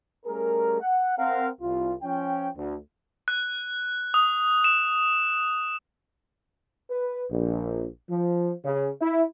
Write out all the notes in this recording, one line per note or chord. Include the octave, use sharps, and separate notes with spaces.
G3 A3 C#4 G#4 A#4
F#5
C4 A#4 F5 F#5
C2 F4
F3 C#4 G5
D2
F#6
D#6
E7
B4
A#1
F3
C#3
E4